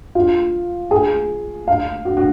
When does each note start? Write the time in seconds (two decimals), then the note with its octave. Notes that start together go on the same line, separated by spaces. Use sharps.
0.15 F4
0.91 G#4
1.68 F5
2.05 F#4
2.17 F#4